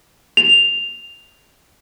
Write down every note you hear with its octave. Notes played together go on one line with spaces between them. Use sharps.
F7